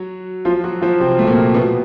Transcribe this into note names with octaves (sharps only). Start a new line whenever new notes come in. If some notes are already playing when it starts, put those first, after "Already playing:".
Already playing: F#3 F#4
F3 F4
F#3 F#4
F3 F4
C3 C4
A3
A#2 A#3
B2 B3